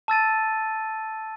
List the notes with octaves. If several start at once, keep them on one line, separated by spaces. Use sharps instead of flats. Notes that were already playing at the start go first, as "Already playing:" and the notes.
A5 E6 A6 D#7